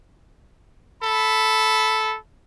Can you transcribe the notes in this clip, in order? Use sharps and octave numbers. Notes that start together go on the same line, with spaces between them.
A4 B5